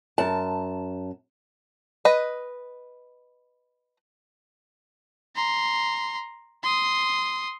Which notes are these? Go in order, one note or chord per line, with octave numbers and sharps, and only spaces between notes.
F#2 A5
B4 D#5
A#5 C6
C6 D#6